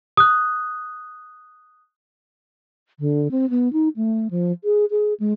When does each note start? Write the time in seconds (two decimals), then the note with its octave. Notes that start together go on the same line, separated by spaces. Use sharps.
0.17 D#6 F#6
3.00 D3
3.31 C4
3.50 B3
3.73 D#4
3.96 A3
4.31 F3
4.64 G#4
4.91 G#4
5.20 G#3